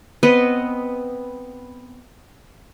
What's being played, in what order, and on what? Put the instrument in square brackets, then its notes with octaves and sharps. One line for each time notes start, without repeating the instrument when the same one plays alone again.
[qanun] B3 C4 B4 D#5